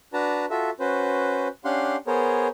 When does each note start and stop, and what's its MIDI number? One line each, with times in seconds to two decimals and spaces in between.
0.13 0.45 62
0.13 0.45 66
0.13 0.45 71
0.13 0.45 81
0.13 0.45 82
0.50 0.70 65
0.50 0.70 66
0.50 0.70 69
0.50 0.70 76
0.80 1.48 61
0.80 1.48 66
0.80 1.48 71
0.80 1.48 72
1.65 1.96 61
1.65 1.96 62
1.65 1.96 67
1.65 1.96 77
1.65 1.96 78
1.65 1.96 84
2.07 2.48 59
2.07 2.48 68
2.07 2.48 70
2.07 2.48 72
2.07 2.48 73